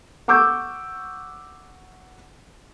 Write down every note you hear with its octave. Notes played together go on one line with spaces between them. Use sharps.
F#5 C#6 D6 E6 G6